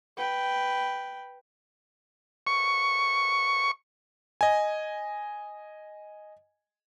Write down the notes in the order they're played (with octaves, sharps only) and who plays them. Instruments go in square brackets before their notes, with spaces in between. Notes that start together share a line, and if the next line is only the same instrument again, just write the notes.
[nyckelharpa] B4 G5
[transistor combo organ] C#6
[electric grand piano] D#5 G#5